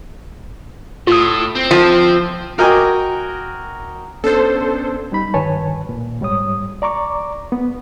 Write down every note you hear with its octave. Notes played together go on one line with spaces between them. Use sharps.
A2 F4 D#6
C4
F3
F#4 A#4 D#5 G5 G#5 D6
B3 C#4 D4 A4 C5
G3 D#4 B5
G2 D#3 B4 C#5 G#5 A5
A#2
G#2 G3 C#5 D#6
D5 A#5 C#6 D6
B3